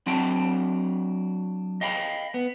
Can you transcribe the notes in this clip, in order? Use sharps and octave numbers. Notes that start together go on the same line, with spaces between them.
F#3 C4 D4 F#4 G5 A5
D#5 F5 G5 A#5 B5
B3